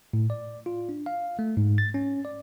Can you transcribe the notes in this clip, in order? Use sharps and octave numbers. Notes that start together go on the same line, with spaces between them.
A2
D5
F4
D4
F5
A3
G#2
A6
C#4
D5